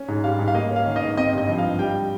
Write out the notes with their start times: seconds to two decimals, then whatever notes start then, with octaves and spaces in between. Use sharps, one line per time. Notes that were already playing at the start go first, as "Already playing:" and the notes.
Already playing: C#4
0.08 G#2
0.24 G3 F5
0.39 G#2
0.48 F5
0.54 A#3 D#5
0.71 C#4
0.76 F5
0.86 D#3
0.91 F5
0.96 D#5
1.02 G#2
1.17 C4 D#5
1.33 G2 D#5
1.49 F3
1.58 F5
1.64 G2
1.79 G3 G5